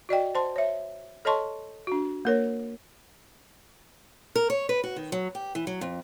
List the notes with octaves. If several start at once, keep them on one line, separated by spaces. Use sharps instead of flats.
F#4 D5 D#5 G5
C5 A5 C6
C#5 E5
A4 C#5 D#5 A5 C6 C#6
D4 F#4
A#3 A#4 C#5
A#4
C#5
B4
F#4
D#3
F#3
G4
E3
F#3
F2